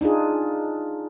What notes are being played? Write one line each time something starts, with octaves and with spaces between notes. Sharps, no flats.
D4 D#4 F4 G#4